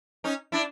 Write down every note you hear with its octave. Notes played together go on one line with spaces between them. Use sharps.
C#4 D#4
D4 E4